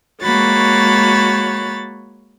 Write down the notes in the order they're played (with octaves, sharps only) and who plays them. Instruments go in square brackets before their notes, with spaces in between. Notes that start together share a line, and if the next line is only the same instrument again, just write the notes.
[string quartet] G#3 A#3 F#4 C#5 B5 A6